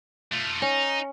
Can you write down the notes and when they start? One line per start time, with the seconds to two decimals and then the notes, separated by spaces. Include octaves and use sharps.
0.33 A3 F4
0.62 C#4 D#4